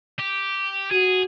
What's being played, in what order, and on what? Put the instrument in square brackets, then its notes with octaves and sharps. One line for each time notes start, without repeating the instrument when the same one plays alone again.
[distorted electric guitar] G4
[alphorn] F#4 [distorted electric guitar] G#4